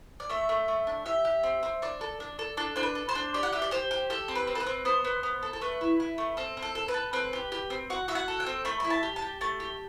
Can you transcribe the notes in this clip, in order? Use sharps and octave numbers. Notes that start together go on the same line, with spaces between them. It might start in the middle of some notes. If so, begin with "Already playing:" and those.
D5
A3 E5
A3
A3
D4
G4 E5
G4
C4
C4
D4 D5
A4
D4
A4
D4 A4
D4 C5
B4
A4
C5
D4
G4 D5
F#5
G4 E5
D5
G4 C5
G4
G4 A4
C4
B4
C4
A4
B4
C4
B3 C5
B3
B3
A4
A4
A3 B4
E4
E4
A3
C4 A4
C4
A4
A4
B4
A4
C4 B4
G4
G4
C4
F#4 F#5
F#4 E5
F#5
A4
G5
C4
A3 B5
E4 B5
A5
G4
A5
G4
A3 A5
G4